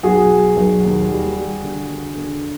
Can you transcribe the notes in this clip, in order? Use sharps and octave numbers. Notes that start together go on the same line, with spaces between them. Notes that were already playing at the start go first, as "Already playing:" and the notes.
B1 F#4 G#4
F#3
B1
D#2
G3
G3
D3
D3
D3